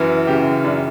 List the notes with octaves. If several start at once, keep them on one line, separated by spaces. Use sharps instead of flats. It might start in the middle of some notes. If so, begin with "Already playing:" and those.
Already playing: F#2 E3
C#3 G4
F#2 D4